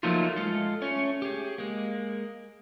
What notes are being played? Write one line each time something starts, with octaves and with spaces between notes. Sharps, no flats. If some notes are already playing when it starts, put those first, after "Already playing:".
F3 F#3 A3 A#3 D#4 F4
G#3 F4 A4
A3 C#4 C#5
G4 G#4
G#3 A#3